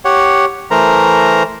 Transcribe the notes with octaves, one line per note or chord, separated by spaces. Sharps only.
G4 C#5 F#5
E3 A3 A#4 C5 A#5